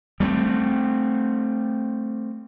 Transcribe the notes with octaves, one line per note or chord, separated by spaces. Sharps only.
G3 A3 A#3 C4